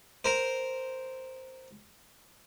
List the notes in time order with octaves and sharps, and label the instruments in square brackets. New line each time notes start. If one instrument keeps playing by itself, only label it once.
[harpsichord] A#4 C5